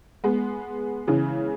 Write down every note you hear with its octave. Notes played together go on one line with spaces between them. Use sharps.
G#3 B3
C#3 E3